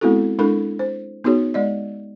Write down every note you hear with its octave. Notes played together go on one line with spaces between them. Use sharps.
G#3 B3 C4 E4 F#4 A4
G#3 D4 E4 A4 A#4 B5
C5
B3 D#4 F#4 G#4 C#5
G#3 D5 D#5